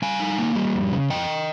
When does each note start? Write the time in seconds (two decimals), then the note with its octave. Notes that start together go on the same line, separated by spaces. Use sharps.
0.02 G3 F5 G#5
0.20 D#4
0.39 A#3
0.55 G3
0.74 F2
0.92 C#3
1.10 F2 D#5 G5